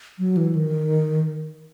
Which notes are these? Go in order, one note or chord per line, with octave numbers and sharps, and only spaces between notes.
F#3
E3
D#3